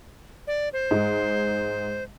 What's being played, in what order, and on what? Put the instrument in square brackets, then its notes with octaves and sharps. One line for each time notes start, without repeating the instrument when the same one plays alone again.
[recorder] D5
C5
[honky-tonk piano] G#2